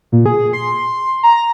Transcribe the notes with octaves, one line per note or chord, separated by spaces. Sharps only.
A#2
G#4
C6
A#5